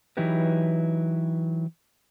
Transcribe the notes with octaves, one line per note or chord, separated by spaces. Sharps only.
E3 F#3 D#4 E4 G4 B4